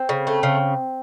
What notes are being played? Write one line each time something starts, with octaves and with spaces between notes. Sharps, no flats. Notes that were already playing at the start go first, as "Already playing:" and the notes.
Already playing: C4
C#3
A3
C#3